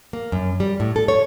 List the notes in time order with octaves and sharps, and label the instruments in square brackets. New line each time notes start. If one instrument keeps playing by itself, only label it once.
[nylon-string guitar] A#3
F#2
G3
A2
A4
C#5